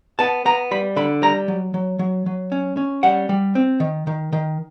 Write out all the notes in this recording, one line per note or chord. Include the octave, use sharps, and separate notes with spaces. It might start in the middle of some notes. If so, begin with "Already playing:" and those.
B3 A5
B3 A#5
G3 B5
D3 B5
G3 A#5
F#3
F#3
F#3
F#3
C#4
C#4
G3 F#5
G3
C4
D#3
D#3
D#3